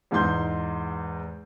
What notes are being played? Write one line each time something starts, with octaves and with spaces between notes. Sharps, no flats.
E2 G#2 D#4 C6 G6